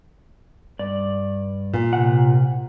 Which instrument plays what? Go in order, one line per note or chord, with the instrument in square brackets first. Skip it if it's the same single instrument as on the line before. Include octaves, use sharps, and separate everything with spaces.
[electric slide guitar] G2 D5
[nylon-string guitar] A#2
[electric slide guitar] C3 F#5